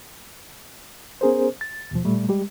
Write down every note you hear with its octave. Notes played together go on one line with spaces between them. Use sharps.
B3 C#4 G#4 A#4 C5
A6
D#2 B2 F3
A#2 G3 A3
G3 G#3 G4